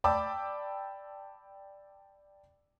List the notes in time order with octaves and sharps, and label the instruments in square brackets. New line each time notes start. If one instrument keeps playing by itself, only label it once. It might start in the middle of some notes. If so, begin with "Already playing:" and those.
[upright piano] D5 G5 A5 B5 D6 E6